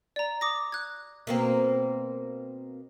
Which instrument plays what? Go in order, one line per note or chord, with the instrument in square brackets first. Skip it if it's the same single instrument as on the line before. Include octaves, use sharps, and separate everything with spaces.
[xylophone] D5 A#5
D6 D#6 A#6
F#6 G#6
[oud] B2 A#3 C4